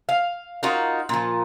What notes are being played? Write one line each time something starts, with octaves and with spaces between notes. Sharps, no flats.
F5
D#4 F4 F#4 A#4
A#2 F3